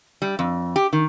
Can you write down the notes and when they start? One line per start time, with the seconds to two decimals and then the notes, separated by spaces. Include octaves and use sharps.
0.22 G3
0.39 F2
0.76 G4
0.93 D#3